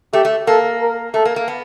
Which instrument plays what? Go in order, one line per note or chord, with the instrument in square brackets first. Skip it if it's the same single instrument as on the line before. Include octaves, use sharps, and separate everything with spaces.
[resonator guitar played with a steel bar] A3 [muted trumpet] G4
[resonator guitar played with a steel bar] A3
[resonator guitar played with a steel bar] A#3 [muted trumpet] A4
[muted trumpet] A#4
[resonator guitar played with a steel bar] A3 [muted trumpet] A4
[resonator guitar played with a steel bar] A#3
A#3
B3